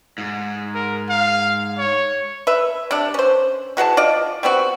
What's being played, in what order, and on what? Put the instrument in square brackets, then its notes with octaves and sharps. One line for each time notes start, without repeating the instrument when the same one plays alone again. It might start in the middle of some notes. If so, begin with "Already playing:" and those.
[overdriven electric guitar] G#2
[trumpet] A#4
F5
C#5
[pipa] B4 E5
C3 D4
C#4 C5
E3 F#4 G#4 A5
F4 D5 D#5
G3 B3 C4 F#4